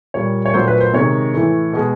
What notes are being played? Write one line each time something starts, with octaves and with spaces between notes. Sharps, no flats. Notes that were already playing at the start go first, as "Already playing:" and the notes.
A#2 G3 C#5
C#5
A#2 F#3 A3 C5
B4
C5
C3 D#3 G#3 C#5
A2 E3 A3
B2 G#3